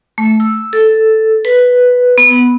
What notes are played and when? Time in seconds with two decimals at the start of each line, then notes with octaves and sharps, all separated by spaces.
0.18 A3
0.40 E6
0.73 A4
1.45 B4
2.18 B3